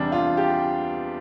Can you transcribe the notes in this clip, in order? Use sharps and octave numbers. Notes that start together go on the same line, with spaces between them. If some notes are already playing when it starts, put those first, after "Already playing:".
Already playing: E2 C3 G3 D4
F4
G4